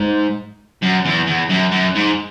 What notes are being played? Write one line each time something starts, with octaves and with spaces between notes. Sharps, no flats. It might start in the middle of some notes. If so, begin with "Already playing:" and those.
Already playing: G#2
F#2
E2
E2
F#2
F#2
G#2